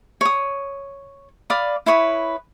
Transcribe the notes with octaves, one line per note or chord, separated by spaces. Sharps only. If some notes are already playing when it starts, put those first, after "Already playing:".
C#5 D#6
D5 F5 B5 D#6
E4 B4 C#5 D#6